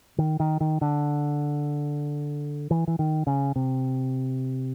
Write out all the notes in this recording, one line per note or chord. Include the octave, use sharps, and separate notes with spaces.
D#3
D#3
D#3
D3
E3
E3
D#3
C#3
C3